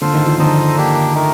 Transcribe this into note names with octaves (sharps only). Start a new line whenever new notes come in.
D3 F4 A4 C5 F5
D#3
F3
D3 D#4 A4 C5 D#5
A#3 D4 G4
A3 D#4 A#4